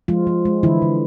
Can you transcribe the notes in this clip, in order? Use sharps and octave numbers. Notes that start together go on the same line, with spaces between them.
F3 G#3 F4
F3
G#3
D3 E3 E4
D3